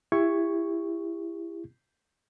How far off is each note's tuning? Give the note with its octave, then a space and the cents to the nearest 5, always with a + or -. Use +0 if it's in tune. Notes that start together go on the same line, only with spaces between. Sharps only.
E4 +20 G4 +35 C#6 +0